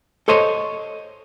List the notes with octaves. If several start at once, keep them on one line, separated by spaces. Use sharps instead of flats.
A4 C5 C#5 D#5 C6